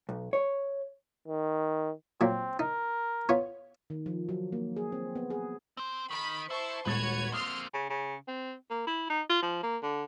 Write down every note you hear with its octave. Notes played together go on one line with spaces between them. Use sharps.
B1
C#5
D#3
A#2 F#3 A#3 C4
D#4 A#4
B3 F4 C#5
D#3
F3
F#3
A#3
G#4
C4
B3
G#4
C4 C5
D#3 B5
E4 C5 A5 C#6
D#1 G#3 F#4 B4 C#5 G#6 A6
A#3 C4 C6 D#6 F6
C#3
C#3
C4
A#3
E4
D#4
F4
F3
A#3
D3